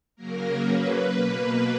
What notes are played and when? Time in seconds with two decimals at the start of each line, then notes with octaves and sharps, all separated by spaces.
0.16 C#3 F#3 A#3 A#4
0.62 B4
1.08 B2 A#3